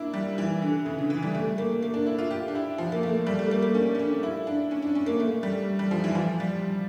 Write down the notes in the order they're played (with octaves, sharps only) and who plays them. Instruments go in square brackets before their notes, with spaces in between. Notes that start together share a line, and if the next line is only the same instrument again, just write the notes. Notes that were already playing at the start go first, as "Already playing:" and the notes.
Already playing: [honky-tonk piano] A#3 D4 E4
G3
E3
D3
C#3
D3
E3
G3
A3
A#3
A#3
D4
E4
F4
G4
D4
E4
F3
A#3
A3
G3
A3
A#3
A#3
C#4
C#4
D4
E4
D4
C#4
D4
C#4
A#3
A3
G3
G3
F3
E3
F3
G3